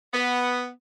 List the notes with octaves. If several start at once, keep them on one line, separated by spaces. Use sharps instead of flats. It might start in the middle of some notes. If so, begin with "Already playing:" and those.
B3